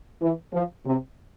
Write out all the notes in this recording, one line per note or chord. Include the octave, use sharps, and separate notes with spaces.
E3
F3
C3